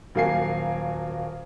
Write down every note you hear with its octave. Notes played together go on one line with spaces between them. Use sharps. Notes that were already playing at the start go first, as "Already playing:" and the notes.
D#1 F#3 A#3 F5 G#5 C7